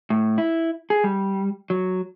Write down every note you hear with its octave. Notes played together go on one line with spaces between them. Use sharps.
A2
E4
G#4
G3
F#3